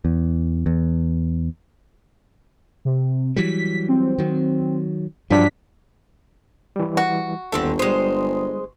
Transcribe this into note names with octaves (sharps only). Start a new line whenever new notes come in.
E2
E2
C3
E3 F#3 G3 B6
C4
D#3 F#3
G2 F3 F#3 D4 B6
E3 G3
F#4
G1 D#2 D3 C4 A4 E5
G3 G#3 C5 D#6